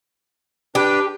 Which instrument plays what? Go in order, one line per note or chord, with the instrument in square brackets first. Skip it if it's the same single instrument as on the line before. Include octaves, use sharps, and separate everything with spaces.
[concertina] D4 B4 [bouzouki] G4